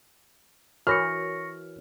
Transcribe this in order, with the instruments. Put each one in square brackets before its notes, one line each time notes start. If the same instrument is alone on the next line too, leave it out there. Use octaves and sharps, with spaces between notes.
[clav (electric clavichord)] E3 [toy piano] F#4 A#4 C#5 [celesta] C#6 A#6 C#7 [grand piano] F6